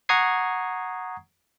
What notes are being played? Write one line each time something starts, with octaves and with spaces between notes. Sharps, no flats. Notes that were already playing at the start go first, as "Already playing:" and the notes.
F#5 A#5 C#6 D#6 G#6 C7